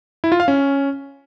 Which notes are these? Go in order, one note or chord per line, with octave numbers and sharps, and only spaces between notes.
E4
F4
F5
C#4